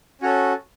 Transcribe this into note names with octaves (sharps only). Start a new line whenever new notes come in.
C#4 F#4 A4 C#5